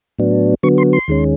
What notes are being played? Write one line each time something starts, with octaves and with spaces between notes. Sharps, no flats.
A2 F#3 B3 D4
D3 F#3 B3 C#6
C6
C6
D#2 D#3 G#3 C#4